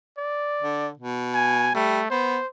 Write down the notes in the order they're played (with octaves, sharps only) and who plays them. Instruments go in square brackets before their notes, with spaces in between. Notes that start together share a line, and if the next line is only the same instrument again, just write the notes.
[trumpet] D5
[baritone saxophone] D3
B2
[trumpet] G#5
[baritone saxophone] G3 [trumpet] A3
[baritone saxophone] B3 [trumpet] C5